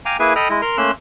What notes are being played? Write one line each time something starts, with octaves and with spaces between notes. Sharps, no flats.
F5 G5 G#5 A#5 D6
A#3 E4 G#4 B4 E5 G#5
A4 D#5 G5 B5 D#6 F6
G#3 E4 D#5
A#4 A#5 C6
A3 A#3 C#4 C6 E6 F#6